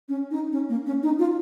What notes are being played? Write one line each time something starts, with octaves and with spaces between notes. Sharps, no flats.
C#4
D#4
C#4
A#3
C#4
D#4
F4